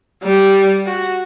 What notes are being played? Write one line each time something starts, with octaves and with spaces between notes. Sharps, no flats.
G3
F#4